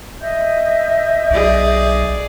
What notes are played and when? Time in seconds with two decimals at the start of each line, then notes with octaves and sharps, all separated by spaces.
0.20 D#5 E5 G6
1.31 B1 G#4 D5